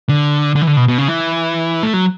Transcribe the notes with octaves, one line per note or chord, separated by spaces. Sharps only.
D3
D3
E3
D3
B2
B2
C#3
E3
A3
F#3